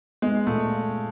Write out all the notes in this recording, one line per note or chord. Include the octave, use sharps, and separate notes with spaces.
G#3 B3
A#2 A3